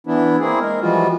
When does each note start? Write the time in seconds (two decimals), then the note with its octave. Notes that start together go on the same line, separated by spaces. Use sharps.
0.07 E3 B3 D4 E4
0.40 A#3 C4 E4 G#4
0.60 G#3 A#4
0.81 E3 F3 G3 G#3 F4 F#4